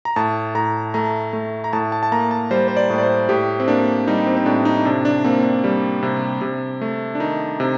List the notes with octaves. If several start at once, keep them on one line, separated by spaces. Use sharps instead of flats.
A#5
A2 A5
A2 A#5
A3 A#5
A3
A#5
A2 A5
A5
A5
A#3 A#5
A5
G3 C5
C5
D5
A2
D5
C5
A2 G4
C4
A#3 D4
G3 D#4
C4
C4
A2 D4
D#4
C3 D4
D4
A#3 C4
D4
G3
C3
C3
A3
D4
D#3 D#4
C3